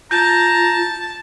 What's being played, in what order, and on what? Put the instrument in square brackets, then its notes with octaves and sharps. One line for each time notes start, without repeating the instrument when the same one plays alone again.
[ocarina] F4 [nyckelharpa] A5 [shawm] A#5 [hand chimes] G6